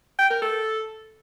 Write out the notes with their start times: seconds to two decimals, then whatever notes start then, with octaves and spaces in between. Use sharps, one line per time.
0.19 G5
0.30 A#4
0.42 A4